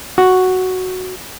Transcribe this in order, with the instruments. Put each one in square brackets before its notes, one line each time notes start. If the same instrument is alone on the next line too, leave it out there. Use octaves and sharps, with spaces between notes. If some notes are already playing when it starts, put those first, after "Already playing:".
[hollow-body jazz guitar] F#4